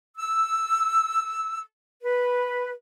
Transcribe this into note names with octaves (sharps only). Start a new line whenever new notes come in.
E6
B4